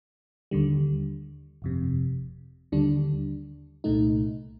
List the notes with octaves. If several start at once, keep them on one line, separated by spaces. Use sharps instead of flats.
D#2 D3 G3
G1 F2 C3
D#2 D3 G3 D4
C2 A#2 A3 D#4